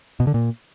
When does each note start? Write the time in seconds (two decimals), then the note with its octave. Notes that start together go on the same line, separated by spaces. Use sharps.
0.20 B2
0.27 D3
0.34 A#2